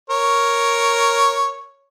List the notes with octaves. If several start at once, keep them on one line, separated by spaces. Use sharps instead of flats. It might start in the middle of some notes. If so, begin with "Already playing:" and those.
A#4 C#5